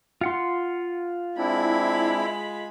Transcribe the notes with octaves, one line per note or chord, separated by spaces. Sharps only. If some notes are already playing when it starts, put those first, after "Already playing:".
F4 F#5 C6
G#3 C4 D4 E4 B5